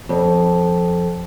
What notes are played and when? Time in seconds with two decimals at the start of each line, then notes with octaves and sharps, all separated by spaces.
0.09 F2